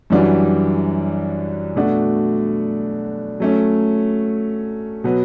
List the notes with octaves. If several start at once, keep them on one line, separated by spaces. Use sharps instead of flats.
F#2 E3 G3 D4 F#4
B2 A3 D4 F#4
F#3 A3 C#4
B2 F#3 B3